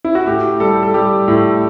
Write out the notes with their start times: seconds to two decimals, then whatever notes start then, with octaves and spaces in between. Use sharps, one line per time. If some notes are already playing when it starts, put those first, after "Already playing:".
0.05 E4
0.15 F#4
0.27 A2 G4
0.60 G3 A4
0.83 A4
0.94 G3 G4
1.28 A2